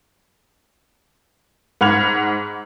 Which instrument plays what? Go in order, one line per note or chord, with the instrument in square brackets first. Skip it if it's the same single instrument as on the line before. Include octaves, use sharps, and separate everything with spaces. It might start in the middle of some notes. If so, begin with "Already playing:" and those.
[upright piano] G#2 F#5 B5 F6 G#6 F7